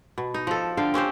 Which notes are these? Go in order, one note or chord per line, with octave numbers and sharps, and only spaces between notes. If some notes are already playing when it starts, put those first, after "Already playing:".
B2
D#4
F3 A4
D3 F5 G5
C4 C#4 G4 C5